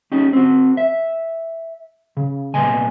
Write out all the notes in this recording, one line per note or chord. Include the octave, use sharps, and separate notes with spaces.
C#4 D#4 G4
C4 F#4
E5
C#3
C2 A#2 F#3 B3 D#5 G#5